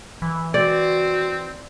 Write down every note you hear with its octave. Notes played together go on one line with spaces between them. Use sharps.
E3
C4 F#4 D5